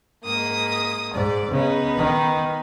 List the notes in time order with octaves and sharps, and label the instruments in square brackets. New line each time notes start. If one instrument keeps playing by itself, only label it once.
[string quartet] G#2 A#3 D#6
[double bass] G#2 [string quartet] D5
[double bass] C#3 [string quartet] B3 D#4 B4
[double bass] D#3